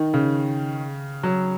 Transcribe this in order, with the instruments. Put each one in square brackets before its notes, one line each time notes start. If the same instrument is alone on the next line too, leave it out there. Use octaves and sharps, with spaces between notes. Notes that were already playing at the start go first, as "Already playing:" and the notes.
Already playing: [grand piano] D#3
C#3
F#3